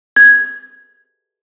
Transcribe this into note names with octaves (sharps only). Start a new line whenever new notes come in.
G#6